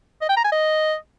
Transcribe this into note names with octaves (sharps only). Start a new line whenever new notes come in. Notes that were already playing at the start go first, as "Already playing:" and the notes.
D#5
G5
A#5
G#5
D#5